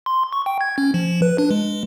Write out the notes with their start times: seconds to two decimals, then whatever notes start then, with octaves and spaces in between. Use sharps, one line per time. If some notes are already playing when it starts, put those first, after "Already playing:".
0.06 C6
0.33 C#6
0.46 G5
0.61 G#6
0.78 C#4
0.94 F3
1.22 B4
1.38 D4
1.51 G#3